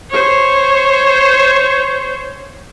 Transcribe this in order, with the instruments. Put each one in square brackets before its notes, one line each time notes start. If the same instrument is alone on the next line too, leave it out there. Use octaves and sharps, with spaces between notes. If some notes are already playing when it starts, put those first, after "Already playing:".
[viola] C5 C#5